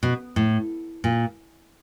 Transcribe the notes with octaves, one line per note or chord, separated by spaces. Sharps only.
B2
A2
A#2